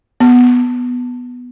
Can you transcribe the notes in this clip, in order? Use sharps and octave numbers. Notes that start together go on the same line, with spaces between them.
B3